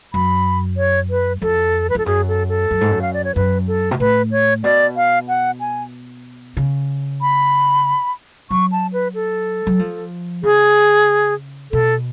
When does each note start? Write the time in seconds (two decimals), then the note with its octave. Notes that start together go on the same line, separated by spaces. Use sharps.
0.14 F#2 B5
0.77 C#5
1.10 B4
1.42 F2 A4
1.90 B4
1.95 F2 A4
2.06 F#2 G#4
2.28 A4
2.49 A4
2.71 F#2
2.81 G#2
2.91 F#2
3.02 F5
3.13 D5
3.24 C#5
3.35 F#2 B4
3.67 A4
3.91 B2
4.00 A2 B4
4.31 C#5
4.63 B2 D5
4.97 F5
5.28 F#5
5.60 G#5
6.57 C#3
7.22 B5
8.51 F#3 C#6
8.72 A5
8.93 B4
9.15 A4
9.67 F#3
9.79 F3
10.43 C#3 G#4
11.72 B2 A4